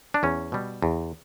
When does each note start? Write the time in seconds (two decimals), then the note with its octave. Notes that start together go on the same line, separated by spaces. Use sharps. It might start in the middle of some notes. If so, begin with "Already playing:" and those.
0.14 D4
0.23 E2 C#4
0.52 B2 G3
0.82 E2